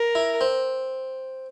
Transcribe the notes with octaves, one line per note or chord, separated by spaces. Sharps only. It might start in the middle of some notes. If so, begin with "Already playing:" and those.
Already playing: A#4
E4
C4